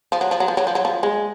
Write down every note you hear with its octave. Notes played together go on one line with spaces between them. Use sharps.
F3
F#3
F3
F#3
F3
F#3
F3
F#3
F3
G#3